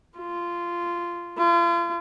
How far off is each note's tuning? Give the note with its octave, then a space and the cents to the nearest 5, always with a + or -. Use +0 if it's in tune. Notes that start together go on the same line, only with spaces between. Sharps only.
F4 -15
F4 -40